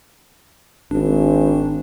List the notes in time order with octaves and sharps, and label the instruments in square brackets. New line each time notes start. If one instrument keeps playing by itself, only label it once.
[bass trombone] G#1 [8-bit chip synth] D4